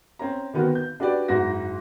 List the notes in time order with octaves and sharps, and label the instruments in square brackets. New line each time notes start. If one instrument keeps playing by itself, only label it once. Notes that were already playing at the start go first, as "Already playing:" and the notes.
[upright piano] C4 C#4 A#5
D3 D#3 B3 C4 F#4 A#4
G6
D4 F#4 G4 B4 D5
F#1 G#2 F#4 A#6